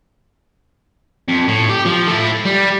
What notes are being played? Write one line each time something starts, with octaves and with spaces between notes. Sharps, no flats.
F2
A2
G4
F3
A3 E4
G3